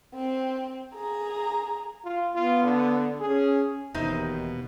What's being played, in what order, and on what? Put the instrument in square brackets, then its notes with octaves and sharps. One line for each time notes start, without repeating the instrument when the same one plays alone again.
[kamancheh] C4
G#4 A#5
[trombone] F4
[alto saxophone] B3 [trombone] F4
[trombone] D3
[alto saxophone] C#4 [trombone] G#4
[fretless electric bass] E1 [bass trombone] D#2 [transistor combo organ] B2 [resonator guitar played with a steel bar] D#4 C5 E5